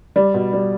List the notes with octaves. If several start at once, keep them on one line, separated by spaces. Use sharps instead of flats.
G3 D5
B2
G3